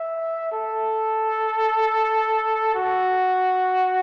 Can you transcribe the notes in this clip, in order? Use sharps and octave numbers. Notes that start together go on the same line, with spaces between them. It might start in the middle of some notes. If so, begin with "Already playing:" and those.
Already playing: E5
A4
F#4